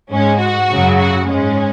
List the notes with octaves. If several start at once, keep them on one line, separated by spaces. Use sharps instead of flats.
G#2 G#3 C#4
F#4
F#2 C#3 F#3
F#4
G#2 G#3 C#4